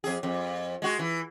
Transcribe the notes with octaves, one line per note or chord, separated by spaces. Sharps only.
F2 G#4
F2
G#3 F#4
E3